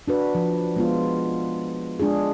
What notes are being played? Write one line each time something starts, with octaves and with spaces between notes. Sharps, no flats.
D4 F#4 B4
F3
G#3 B3 F4
G#3 D4 F4 G#4